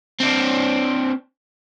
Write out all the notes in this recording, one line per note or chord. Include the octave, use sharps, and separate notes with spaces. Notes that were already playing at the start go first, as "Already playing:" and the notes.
C4 D4